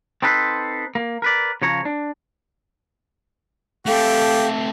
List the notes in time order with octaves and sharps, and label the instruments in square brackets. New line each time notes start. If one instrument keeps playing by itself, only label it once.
[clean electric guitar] C4 D#4 A4 B4 C5
A#3
A#4 B4 D5
C#3 F3 C#5 A#5
D4
[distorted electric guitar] A3 C4 [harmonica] G4 [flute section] A4 F5